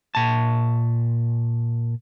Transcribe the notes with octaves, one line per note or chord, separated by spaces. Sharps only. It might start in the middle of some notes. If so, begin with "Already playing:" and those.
A#2 A5